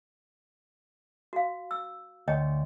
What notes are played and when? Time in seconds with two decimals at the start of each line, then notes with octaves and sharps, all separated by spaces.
1.33 F#4 F5
1.71 E6
2.28 D2 C#5 D#5 G5